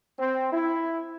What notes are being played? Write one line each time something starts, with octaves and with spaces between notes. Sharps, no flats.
C4
E4